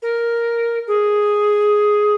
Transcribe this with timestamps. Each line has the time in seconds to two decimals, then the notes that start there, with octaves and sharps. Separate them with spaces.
0.02 A#4
0.87 G#4